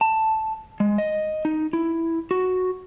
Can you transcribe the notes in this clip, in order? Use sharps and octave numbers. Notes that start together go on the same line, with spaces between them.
A5
G#3
D#5
D#4
E4
F#4